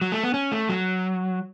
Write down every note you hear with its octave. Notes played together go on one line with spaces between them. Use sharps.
F#3
A3
B3
C#4
A3
F#3